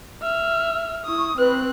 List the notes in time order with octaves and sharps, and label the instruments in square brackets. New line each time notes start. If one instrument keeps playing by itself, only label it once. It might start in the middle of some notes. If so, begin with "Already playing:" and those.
[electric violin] E5 F6
[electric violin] E4 D#6 [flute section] C#6
[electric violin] C4 F#6 [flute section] B4